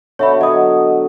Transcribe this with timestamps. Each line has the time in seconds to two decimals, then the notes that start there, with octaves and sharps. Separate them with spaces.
0.19 B2 D3 C#5 E5 B5 C#6
0.41 F#3 D#5 D#6